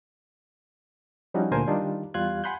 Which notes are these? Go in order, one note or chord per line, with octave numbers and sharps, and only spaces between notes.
F3 G3 C#4 D#4 E4 F#4
D2 A#2 D4 A#4 C5 G#5
D#3 G3 D4 D#4 F4
E2 G3 F4 F5 F#6 G#6
F#5 G#5 B5 C6 F#6 G6